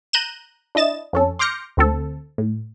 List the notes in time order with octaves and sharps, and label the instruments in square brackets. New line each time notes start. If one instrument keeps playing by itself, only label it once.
[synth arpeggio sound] A#5 F#6 G6 D#7 E7
D4 E4 D#5 A6 E7
F2 C#4 A4
C6 D6 F6 G6 A#6 C#7
D2 C4 A4
A2